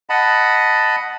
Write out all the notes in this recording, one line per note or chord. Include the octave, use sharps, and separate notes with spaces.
D#5 F#5 A5 B5